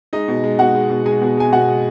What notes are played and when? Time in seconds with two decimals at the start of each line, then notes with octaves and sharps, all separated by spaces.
0.13 G#3 D#4 D#5
0.28 B2
0.44 G#3
0.59 B2 F#4 F#5
0.75 G#3
0.90 B2
1.06 G#3 G#4 G#5
1.22 B2
1.37 G#3 G#5
1.52 B2 F#4 F#5
1.68 G#3